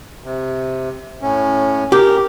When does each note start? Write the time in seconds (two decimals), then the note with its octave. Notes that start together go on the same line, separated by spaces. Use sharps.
0.24 C3
1.22 A2 C#4
1.92 G4 A#4